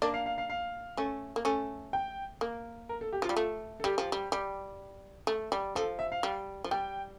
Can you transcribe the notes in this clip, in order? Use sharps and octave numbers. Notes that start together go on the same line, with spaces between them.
A#3 D4 D5
F5
F5
F5
F5
A3 C#4
A#3
A3 C#4
G5
A#3
A#4
A4
G4
F3
G3 F4
A3
A4
G3 G4
F3
G3
G3
A3
G3
F3 A4
E5
F5
G3
F3
G3 G5